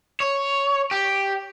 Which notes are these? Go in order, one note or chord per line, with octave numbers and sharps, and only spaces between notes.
C#5
G4